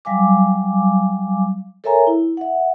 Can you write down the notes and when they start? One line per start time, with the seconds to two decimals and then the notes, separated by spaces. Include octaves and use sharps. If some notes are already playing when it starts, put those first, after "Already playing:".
0.05 F#3 G3 F5 G#5 D6
1.84 A4 A#4 C#5 E5 G#5 A#5
2.07 E4
2.37 E5 F#5